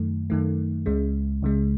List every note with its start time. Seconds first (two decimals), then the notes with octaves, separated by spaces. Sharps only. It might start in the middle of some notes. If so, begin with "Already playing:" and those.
Already playing: F#2 D#3 A3
0.30 F#2 D#3 A3
0.86 C#2 C#3 G#3
1.42 C#2 C#3 G#3